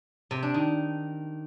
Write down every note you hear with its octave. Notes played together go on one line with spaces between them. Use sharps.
C3
D4
D#3